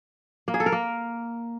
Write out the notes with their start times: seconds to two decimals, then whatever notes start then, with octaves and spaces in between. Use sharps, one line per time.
0.48 A#3
0.54 G#4
0.60 A4
0.66 A#4
0.72 A#3